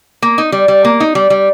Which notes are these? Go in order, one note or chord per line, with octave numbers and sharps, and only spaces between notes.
A#3
D#4
G3
G3
A#3
D#4
G3
G3